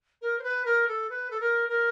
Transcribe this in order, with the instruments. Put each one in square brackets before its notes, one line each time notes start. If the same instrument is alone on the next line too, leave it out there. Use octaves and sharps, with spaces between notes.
[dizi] A#4
C5
B4
A#4
A4
B4
A4
A#4
A#4